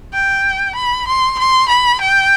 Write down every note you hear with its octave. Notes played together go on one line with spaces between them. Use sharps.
G5
B5
C6
C6
B5
G5